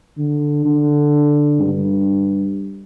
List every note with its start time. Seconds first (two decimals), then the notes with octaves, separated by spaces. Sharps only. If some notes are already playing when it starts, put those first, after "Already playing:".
0.18 D3
0.65 D3
1.61 G2